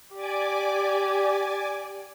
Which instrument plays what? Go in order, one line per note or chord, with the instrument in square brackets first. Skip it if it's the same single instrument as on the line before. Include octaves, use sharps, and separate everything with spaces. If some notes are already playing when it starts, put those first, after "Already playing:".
[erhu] G4 [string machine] D5 G#5 D6